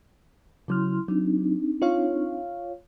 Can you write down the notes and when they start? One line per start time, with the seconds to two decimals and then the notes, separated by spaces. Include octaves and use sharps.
0.68 C#3 F#3 E4 C6 F6
1.08 F#3 C4 D4 D#4
1.82 F4 C#5 F5